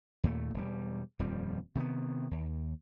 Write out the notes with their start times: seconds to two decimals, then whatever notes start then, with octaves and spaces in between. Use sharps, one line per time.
0.23 D#2 A#2 A3
0.54 E1 G3
1.19 D#1 F2 F3 G3
1.75 C3 D#3 F#3 B3
2.31 D#2